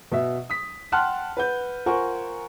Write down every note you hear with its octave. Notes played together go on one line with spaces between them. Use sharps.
B2 E5
D#6 B6
F#5 G5 A5 C6 F6 F#6
B4 F#5 G6
F4 A#4 C5 F#5 G#5 C#6